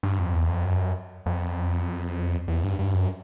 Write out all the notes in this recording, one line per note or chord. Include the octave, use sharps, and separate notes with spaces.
G2
F2
E2
F2
F#2
F2
E2
G2
G2
F#2